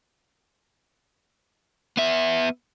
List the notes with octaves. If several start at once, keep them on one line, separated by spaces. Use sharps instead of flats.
B3 E5